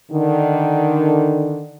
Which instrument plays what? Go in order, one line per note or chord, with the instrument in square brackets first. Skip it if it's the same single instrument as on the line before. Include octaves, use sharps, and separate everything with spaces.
[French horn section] D3 D#3